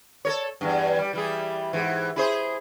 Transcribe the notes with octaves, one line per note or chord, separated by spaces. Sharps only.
A4 A#4 C#5
E2 G2
G3
E3 G3 G#4
G#2 E3
E4 G#4 C5